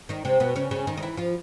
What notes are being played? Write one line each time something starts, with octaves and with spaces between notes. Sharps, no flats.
D#3 D#4
C3 C4
B2 B3
C#3 C#4
C#3 C#4
D#3 D#4
D#4
E3 E4
F3 F4